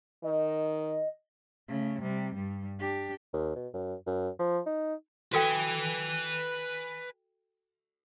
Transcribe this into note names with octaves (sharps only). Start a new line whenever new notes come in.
D#3 D#5
C#3 A3
C3 G3
G2 G3
D4 G4
D#2
B2
F#2
F#2
F3
D#4
F#4 A4 B4 G5 G#5